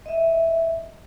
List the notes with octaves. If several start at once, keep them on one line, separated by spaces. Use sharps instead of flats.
D#5 E5